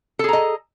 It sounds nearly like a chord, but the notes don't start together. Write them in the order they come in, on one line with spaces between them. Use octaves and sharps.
A4 G#4 A#5 D#5